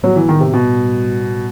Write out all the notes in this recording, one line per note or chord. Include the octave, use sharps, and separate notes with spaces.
A2 F#3 G3 B3 F#4
E3
D#3
C3
B2